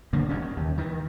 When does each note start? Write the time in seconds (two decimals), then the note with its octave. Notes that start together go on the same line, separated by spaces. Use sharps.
0.13 D3 D#3 G3 A#3
0.29 G1 F2 G3 C#4
0.42 D#3
0.57 D#2
0.78 D#3 E3